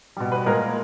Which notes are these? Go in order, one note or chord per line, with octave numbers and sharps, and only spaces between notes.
B2 G3
B4
A#2 G#3 A#4